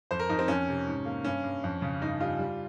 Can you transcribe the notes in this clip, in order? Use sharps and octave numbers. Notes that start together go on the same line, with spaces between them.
F2 C5
A#4
F2 D#4
C4
F2 C#4
C3
G#2
A#3
G2 C#4
G2
F2
C#3
G2 D#4
G3 F4
G3